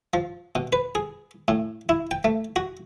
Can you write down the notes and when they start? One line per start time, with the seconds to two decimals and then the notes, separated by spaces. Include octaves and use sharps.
0.14 F3
0.55 B2
0.73 B4
0.95 G#4
1.48 A2
1.89 E4
2.11 G5
2.24 A3
2.56 F#4